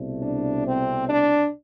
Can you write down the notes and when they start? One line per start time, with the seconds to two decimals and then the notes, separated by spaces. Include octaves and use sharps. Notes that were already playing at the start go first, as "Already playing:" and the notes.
Already playing: C2 B2 A3
0.22 D4
0.65 C4
1.08 D4